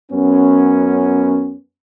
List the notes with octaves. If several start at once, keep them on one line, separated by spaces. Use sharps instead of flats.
F#2 B3 C#4